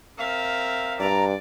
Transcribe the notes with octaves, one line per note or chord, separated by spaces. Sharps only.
C4 A#4 E5 F5
G2 D5 A#5